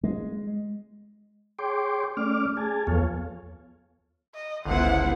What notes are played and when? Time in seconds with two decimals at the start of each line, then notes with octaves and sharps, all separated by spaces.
0.03 G#3
1.59 G#4 C#5 G5 C6 D6
2.17 A3 C#4 D5 D6 F6
2.57 G#4 G#5 A5
2.87 E2 F3 B3 A4 C#5 F5
4.35 D#5
4.65 G1 C#2 B3 E4 C5 F#5